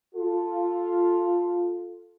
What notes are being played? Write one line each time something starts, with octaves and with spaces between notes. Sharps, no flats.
F4 A4